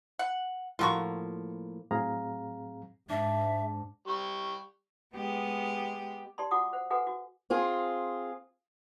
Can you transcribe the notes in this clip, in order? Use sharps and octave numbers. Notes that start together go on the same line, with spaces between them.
F#5
A2 F3 A#3 F4 F#4 C#6
A2 F#3 C4 G#4 F5 A#5
G#2 D4 E5
G3 C#6
G#3 B3 G4
G4 D5 A5 C6
F4 F#4 F#5 D6 D#6
C5 F#5
F#4 G#4 A4 B4 F#5 G#5
F#4
C4 F4 G#4